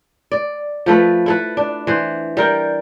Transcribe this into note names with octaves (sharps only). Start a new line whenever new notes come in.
D5
F3 A3 A4 B4
E4 A4 B4
D4
E3 C5
G3 A#4 G5